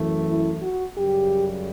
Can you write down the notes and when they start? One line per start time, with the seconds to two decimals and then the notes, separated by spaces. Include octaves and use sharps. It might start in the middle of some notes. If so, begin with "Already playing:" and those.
Already playing: F#2 E3 A3
0.27 E4
0.61 F#4
0.96 F#2 C#3 G3 G4